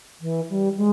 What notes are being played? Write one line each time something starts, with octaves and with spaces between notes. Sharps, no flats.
E3
G3
G#3